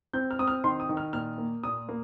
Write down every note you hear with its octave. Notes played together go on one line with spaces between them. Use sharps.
C4 G6
F6
C4 D#6
F6
D#3 C6
D#6
D#3
F6
A#2 F6
A#3
A#2 D#6
A#3